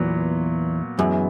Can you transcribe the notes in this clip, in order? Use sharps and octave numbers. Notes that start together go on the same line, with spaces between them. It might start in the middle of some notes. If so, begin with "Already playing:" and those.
Already playing: E2 A#2 F#3 B3
F#2 E3 G#3 B3 E4